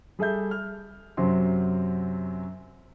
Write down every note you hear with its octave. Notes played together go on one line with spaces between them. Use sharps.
G3 G#4 A4 E5 G6
F6
F#2 C3 F#3 C6